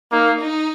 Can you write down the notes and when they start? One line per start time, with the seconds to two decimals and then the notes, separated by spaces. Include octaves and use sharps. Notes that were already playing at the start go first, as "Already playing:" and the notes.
0.12 A#3 D#4
0.40 D#4